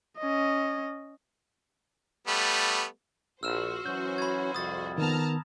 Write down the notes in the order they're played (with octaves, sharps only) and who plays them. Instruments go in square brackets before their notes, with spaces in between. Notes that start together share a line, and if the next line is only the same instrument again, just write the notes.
[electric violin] C#4 D#5
[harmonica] G3 A3 B3
[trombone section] A#1 [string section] F#4 C5 [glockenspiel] E6 F6 E7
[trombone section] E3 F#3 C#4 [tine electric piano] G6
[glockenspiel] B5 G#6
[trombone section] C2 F2 [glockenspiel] D#6 A6
[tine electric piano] D#3 B3 [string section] A5 A#5 F6